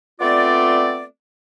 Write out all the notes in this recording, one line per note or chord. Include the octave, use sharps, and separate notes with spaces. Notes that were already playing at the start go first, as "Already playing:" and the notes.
A3 B3 C4 F4 D5